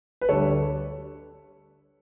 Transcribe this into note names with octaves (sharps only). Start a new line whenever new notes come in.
B4
D2 D3 G3 A4 C#5